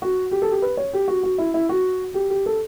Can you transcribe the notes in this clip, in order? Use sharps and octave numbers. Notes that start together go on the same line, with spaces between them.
F#4
G4
A4
G4
B4
C#5
G4
F#4
F#4
E4
E4
F#4
G4
G4
A4